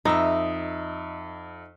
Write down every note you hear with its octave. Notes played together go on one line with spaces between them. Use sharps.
F2 D#4 D#5 E5 E6